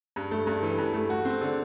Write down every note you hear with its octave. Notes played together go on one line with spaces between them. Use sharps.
G2
A3
G2
E3
G2
A3
F#4
C4
D3